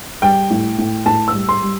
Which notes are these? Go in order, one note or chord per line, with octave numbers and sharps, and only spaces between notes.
G3 G5
A2
A2
A2 A5
E6
G3
C6
G3